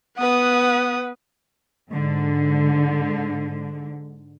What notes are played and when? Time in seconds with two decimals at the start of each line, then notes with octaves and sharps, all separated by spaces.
0.18 B3 B4 F#5 D#6
1.91 G#2 D3